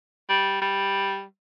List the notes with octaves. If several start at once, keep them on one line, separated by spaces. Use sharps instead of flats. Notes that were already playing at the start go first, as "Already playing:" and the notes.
G3
G3